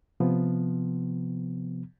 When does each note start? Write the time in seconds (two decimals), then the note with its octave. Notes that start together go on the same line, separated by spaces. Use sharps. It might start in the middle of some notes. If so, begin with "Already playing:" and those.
0.20 C3 F3 B3